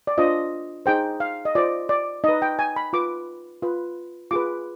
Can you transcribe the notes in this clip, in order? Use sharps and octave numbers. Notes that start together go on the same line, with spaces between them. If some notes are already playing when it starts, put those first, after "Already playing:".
D5
D4 F4 C5 D#5
D#4 G#4 C5 G5
F5
D#5
F4 C5 D5
D5
D#4 B4 D#5
G5
G#5
B5
F4 B4 D6
F4 B4
F4 G#4 B4 D6